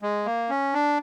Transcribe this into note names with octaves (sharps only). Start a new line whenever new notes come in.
G#3
A#3
C#4
D4